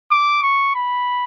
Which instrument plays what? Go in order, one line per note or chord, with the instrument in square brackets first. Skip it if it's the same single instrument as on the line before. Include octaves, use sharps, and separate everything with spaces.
[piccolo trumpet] D6
C#6
B5